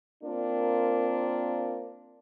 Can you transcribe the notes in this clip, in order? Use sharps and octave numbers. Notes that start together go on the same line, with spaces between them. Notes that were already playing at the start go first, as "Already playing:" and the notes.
A#3 C4 D4 F4 A#4